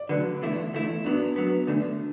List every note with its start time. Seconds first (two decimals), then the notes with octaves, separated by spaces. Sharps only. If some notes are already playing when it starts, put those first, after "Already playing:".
Already playing: D5
0.09 D2 D3 F#3 B4
0.41 E2 D3 A3 E4
0.73 E2 D3 A3 E4
1.04 F#2 F#3 B3 D4
1.36 F#2 F#3 B3
1.67 D2 D3 A3 D4